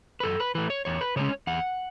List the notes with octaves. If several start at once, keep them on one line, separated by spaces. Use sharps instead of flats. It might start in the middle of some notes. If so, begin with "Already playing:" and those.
B4
F#2 A4
B4
E3 A3 B4
C#5
E2 C#5
B4
C#3 G#3 C#4 C#5
E2 F#5